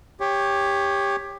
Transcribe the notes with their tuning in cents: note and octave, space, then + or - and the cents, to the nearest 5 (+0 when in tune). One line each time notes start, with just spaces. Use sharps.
G4 +20 C#5 +0